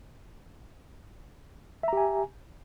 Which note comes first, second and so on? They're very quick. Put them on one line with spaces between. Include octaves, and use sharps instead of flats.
E5 A#5 G4 G#5